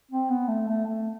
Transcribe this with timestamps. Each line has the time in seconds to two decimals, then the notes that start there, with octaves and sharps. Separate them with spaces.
0.11 C4
0.30 B3
0.48 A3
0.68 A3
0.86 A3